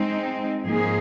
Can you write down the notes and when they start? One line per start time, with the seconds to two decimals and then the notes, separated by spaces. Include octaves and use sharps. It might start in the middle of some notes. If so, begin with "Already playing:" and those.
Already playing: G#3 C4 D#4
0.65 G#2 F3 A#3 D#4 G#4